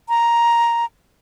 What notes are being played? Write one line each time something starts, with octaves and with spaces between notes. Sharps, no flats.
A#5